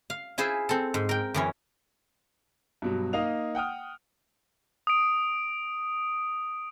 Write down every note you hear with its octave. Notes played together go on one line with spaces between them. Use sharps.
F5
E4 F4 G#4 C5 E5
C4 A4
G#2
A#4 G5
F#2 E3 C#4
G2 B2 F#3
A#3 D#4 F5 D#6 F7
F#5 G5 D#6 F6
D#6 D7